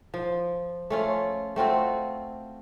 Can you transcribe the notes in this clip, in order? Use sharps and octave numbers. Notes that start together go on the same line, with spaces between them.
F3
A3 C#4 F4
A3 C4 F4 F#4